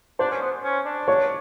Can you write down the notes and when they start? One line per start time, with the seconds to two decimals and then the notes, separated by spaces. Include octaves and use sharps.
0.19 D4 C5
0.31 C#4
0.41 B3
0.63 C#4
0.85 D4
1.08 C#5